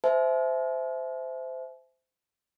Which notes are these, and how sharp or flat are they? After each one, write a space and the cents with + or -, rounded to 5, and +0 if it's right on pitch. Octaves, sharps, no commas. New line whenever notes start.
C5 -20 E5 +0 G#5 +45